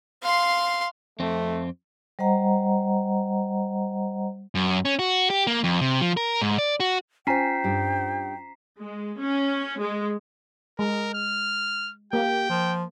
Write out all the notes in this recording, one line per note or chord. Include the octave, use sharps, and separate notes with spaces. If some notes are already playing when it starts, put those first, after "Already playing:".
F5 C6
F2 A3 C4
G3 C5 D#5 F#5 A#5
F#2
C#4
F#4
G4
A#3
F2
C3
F3
A#4
G#2
D5
F#4
C#4 F4 C5 G5 G#5 A#5 B6 C7
G2 G4
G#3
C#4
G#3
G#3 A#4
F6
A#3 G4 G5
F3